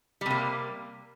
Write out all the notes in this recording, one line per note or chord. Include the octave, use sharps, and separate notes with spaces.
C3 G3 A#3